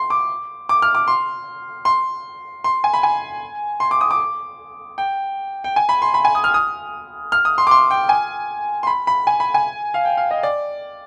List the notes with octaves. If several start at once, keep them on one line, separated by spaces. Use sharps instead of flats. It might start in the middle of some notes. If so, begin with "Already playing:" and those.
Already playing: C6
D6
D6
F6
D6
C6
C6
C6
G#5
B5
G#5
C6
D6
D#6
D6
G5
G5
G#5
B5
C6
B5
G#5
D#6
F6
D#6
F6
D#6
C6
D6
C6
G5
G#5
C6
B5
B5
G#5
B5
G#5
F5
G5
F5
D#5
D5